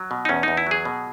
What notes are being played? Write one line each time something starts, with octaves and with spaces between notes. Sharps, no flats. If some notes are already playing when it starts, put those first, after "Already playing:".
Already playing: F#3
B2
D#4
E2 C#4
E2 D#4
E4
F#3 G#4
B2